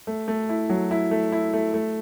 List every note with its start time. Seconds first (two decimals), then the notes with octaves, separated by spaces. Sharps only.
0.07 A3
0.28 A3
0.49 E4
0.70 F#3
0.91 E4
1.11 A3
1.32 E4
1.53 A3
1.74 A3